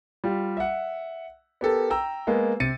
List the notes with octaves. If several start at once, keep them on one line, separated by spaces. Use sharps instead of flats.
G3 F4 G4
E5 F#5
B3 G4 A4 A#4
G5 A#5 E6
G#3 A#3 B3
C3 A6 C#7 D#7